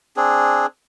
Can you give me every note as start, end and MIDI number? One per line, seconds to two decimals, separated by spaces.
0.17 0.66 60
0.17 0.66 62
0.17 0.66 68